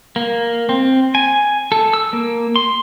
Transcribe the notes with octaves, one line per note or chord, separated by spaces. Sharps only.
A#3
C4
G#5
A4
E6
A#3
C6